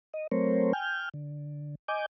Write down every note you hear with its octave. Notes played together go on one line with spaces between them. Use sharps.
D#5
F#3 A3 C4 A#4 C5 C#5
G5 G#5 F6 G6
D3
D#5 G#5 D6 G6